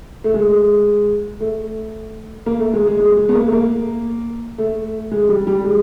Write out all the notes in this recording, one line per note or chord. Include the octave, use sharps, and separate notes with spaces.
A3
G#3
A3
A#3
A3
G#3
G#3
G#3
G#3
B3
A#3
A3
A#3
A3
G#3
G3
G3
G#3